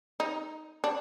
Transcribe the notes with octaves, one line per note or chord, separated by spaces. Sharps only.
D#4
D4